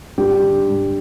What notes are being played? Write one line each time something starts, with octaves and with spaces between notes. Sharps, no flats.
G3 G4
D3
G2